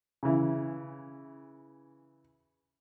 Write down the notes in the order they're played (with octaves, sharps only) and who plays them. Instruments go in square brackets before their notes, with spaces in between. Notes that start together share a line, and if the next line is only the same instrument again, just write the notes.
[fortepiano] C#3 E3